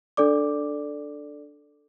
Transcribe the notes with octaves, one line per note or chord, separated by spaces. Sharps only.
D4 A4 D5 D6